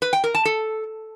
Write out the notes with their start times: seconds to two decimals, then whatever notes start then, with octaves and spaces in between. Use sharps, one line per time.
0.02 B4
0.13 G5
0.24 A#4
0.34 A5
0.45 A4